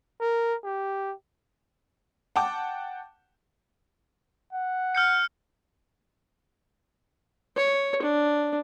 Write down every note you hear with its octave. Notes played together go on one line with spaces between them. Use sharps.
A#4
G4
F#5 G5 A5 D6
F#5
F6 G6 C#7
C#5
D4